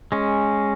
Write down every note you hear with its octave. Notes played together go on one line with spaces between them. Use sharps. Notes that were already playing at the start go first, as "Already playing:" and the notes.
G#3 C#4